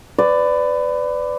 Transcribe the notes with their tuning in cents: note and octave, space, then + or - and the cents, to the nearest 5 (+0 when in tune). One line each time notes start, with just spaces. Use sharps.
B4 +25 D5 +0